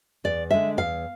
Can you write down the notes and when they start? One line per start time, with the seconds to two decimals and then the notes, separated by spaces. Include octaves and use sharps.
0.24 E2 D5
0.51 D3 G#3 E5
0.77 E2 F5